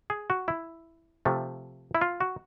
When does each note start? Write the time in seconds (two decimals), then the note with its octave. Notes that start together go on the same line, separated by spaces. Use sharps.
0.10 G#4
0.30 F#4
0.48 E4
1.25 C3 F3 A3
1.95 E4
2.01 F4
2.20 F#4